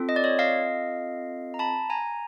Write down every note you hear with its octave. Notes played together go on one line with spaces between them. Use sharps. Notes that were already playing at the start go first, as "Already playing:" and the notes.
Already playing: C4 F4 A4
D#5
D5
C#5 D#5
D#5 F5
A#5
A5 B5
G#5 A#5